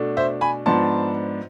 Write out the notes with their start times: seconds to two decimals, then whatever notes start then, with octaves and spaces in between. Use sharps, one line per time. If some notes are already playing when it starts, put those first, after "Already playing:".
Already playing: B2 A3 D4
0.17 C5 E5
0.41 G#5 B5
0.66 G#2 F3 B3 D4 A5 C6